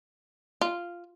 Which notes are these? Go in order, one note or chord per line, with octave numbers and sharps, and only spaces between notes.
F4